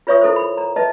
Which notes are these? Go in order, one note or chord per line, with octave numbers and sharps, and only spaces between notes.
F4 B4 C#5 E5 C#6 D#6
E4 A4 A#4 C5
B5
A#5
B4 D#5 E5 A5